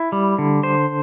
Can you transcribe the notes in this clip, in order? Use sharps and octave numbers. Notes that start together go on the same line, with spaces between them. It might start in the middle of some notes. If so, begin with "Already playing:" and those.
Already playing: E4
G3
D3
C5